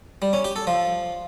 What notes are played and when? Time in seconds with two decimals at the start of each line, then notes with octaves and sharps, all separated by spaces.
0.22 G3
0.33 C#4
0.44 G4
0.56 A4
0.67 F3